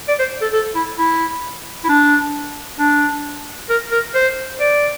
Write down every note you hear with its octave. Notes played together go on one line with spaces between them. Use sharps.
D5
C5
A4
A4
E4
E4
E4
D4
D4
A#4
A#4
C5
D5